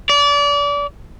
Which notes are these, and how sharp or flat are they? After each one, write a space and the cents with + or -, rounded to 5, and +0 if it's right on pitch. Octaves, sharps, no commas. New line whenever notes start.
D5 -30